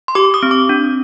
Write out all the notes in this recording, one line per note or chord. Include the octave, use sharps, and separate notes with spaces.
C6
G4 D6
D#6
C4
D6
D4